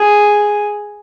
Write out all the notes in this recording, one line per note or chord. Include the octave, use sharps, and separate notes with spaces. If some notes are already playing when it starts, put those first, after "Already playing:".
Already playing: G#4